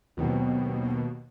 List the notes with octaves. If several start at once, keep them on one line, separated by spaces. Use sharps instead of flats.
D#2 B2 F#3 B3 C4